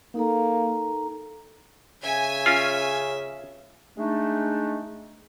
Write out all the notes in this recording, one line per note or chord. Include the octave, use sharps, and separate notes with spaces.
A#3 D#4 A4 A#5
C#3 E5 G#5
C#4 F4
G#3 A3 D4 D#4